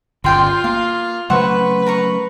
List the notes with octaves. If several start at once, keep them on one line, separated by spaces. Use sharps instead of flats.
G1 A#2 C#3 F4 D5 G5 C6
A#3 F5
C#3 F#3 A3 B4 C5 F#5 C#6
A#4 A#5 C#6